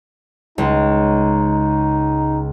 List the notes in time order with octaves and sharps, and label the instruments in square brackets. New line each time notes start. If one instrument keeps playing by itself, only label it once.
[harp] C#2 [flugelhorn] D#4